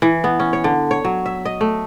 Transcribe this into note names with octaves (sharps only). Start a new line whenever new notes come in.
E3
B3
C#4
C#5
D3
C#5
F#3
E5
D#5
A3